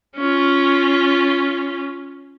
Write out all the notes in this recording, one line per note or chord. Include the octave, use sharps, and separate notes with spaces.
C#4 F4